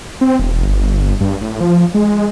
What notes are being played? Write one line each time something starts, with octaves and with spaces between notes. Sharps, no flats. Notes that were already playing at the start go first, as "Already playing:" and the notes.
C4
E1
G1
G2
A2
F3
G#3